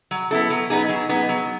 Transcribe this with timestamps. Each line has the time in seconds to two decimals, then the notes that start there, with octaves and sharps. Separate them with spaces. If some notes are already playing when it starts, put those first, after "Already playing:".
0.11 F#3
0.31 B3 E4 A4
0.50 F#3
0.70 B3 D#4 G#4
0.89 F#3
1.09 B3 D#4 G#4
1.29 F#3